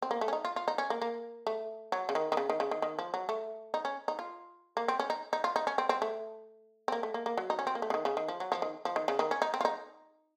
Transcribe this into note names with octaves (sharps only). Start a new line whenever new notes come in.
C4
A#3
A3
C#4
D#4
F4
F4
D#4
C#4
A#3
A#3
A3
F#3
C#3
D#3
D#3
C#3
D#3
C#3
D#3
D#3
F3
F#3
A3
D#4
C#4
D#4
F4
A#3
C4
C#4
D#4
D#4
F4
D#4
C#4
C4
C4
A3
C4
A#3
A3
A#3
A#3
F#3
D#4
C#4
C4
A#3
A3
C#3
D#3
C#3
D#3
F3
F#3
F3
D#3
F3
D#3
C#3
D#3
C#4
D#4
C4
F4
D#4